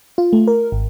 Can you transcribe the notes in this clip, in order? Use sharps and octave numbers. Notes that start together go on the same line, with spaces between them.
F4
A3
A#4
G#1